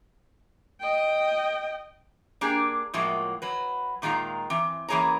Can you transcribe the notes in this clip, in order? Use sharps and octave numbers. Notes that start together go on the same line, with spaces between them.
D#5 G5
A#3 D4 G4 G#4
A2 F3 F#3 G#3 A#3
F#3 B4
A#2 D#3 G#3 F4 A#5
E3 C4
F#2 E3 A#3 G#4 C#5 A#5